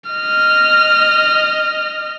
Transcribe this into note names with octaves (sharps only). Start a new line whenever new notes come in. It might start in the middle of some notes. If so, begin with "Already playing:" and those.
D#5 F6